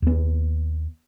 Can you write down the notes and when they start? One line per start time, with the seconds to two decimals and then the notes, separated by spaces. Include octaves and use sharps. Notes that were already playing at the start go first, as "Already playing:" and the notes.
0.02 D#2 B3